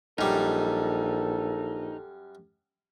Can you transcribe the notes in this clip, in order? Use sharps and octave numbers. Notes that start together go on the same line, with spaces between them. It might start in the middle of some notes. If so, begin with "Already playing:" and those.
A#1 F#2 G3 D#4 A4